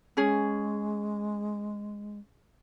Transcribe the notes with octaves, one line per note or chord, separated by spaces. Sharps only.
G#3 C#4 G#4